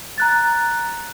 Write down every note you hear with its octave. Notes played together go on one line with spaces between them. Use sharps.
A#5 F#6 A6